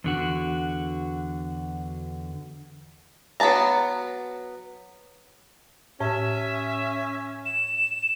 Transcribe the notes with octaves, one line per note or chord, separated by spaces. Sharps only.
E2 D3 F#4
F#3 B3 B4 A5 A#5
A2 C#4 E5
E7